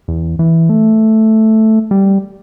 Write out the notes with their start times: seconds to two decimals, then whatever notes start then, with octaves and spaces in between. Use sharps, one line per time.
0.08 E2
0.39 E3
0.69 A3
1.91 G3